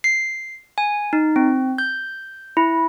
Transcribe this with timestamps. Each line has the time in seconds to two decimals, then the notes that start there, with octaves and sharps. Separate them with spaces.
0.04 C7
0.78 G#5
1.13 D#4
1.36 C4
1.78 G6
2.57 E4